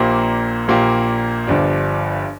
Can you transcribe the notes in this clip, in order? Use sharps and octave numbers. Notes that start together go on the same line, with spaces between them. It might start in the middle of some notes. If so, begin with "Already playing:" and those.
Already playing: A#1 A#2 A#3 G4
A#1 A#2 A#3 G4
G1 G2 F3 D4